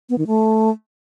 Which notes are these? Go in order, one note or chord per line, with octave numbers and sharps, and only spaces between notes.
B3
D#3
A3